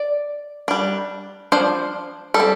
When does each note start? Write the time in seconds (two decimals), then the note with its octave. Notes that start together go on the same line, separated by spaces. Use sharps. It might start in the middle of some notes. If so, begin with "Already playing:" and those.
Already playing: D5
0.68 G3 D4
1.52 F3 D4 C5
2.34 G3 A4
2.40 C4